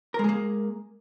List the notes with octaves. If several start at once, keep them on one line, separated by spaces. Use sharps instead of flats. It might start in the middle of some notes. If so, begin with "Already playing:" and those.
G#3 A#3 G#4 A#4